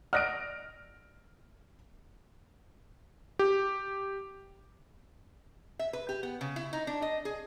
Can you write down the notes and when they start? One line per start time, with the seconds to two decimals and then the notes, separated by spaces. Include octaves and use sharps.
0.13 D5 D#5 F#5 F6 A#6 D7
3.39 G4
5.79 E5
5.93 B4
6.09 G4
6.23 B3
6.41 C#3
6.56 E4
6.73 D#4
6.87 D4
7.02 D#5
7.25 G#4